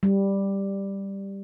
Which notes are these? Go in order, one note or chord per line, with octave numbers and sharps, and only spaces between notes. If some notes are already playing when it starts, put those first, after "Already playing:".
G3